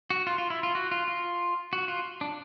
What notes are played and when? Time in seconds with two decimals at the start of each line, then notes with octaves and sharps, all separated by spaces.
0.10 F#4
0.27 F4
0.38 F4
0.50 E4
0.63 F4
0.75 F#4
0.91 F4
1.08 F4
1.73 F#4
1.88 F4
2.21 D4